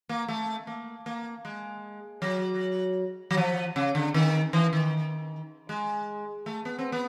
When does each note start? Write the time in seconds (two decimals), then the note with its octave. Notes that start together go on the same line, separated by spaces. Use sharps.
0.09 A#3
0.28 A3
0.67 A#3
1.06 A#3
1.45 G#3
2.22 F#3
3.31 F#3
3.37 F3
3.76 C#3
3.95 D3
4.14 D#3
4.53 E3
4.73 D#3
5.69 G#3
6.46 A3
6.65 B3
6.79 C4
6.92 B3